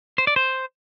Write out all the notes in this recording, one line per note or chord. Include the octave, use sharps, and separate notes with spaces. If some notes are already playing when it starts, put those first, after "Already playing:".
C5
D5
C5